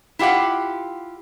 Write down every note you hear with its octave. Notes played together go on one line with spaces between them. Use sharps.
E4 F4 G4 F5 F#5